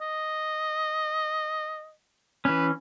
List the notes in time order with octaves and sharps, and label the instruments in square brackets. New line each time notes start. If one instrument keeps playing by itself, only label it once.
[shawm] D#5
[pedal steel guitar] E3 C#4 [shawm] B4